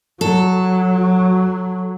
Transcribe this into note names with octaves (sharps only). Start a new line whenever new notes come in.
F#3 A4